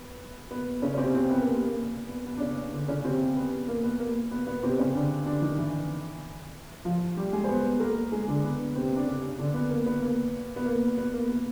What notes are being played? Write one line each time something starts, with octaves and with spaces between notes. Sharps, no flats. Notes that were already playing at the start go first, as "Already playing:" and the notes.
Already playing: B3
B3
C#3 C#4
C#4
C3 C4
C3 C4
B3
A#3
A#3
B3
B3
D4
C#3 C#4
D3 D4
C#3 C#4
C3 C4
B3
A#3
B3
A#3
B3
B3
C3 C4
C#3 C#4
D3 D4
D3 D4
D#3 D#4
E3 E4
F3 F4
G3 G4
G#3 G#4
C5
B3 B4
A#3 A#4
G#3 G#4
D3 D4
B3
C3 C4
D4
C#3 C#4
D3 D4
B3
A#3
B3
A#3
B3
A#3
B3
A#3
B3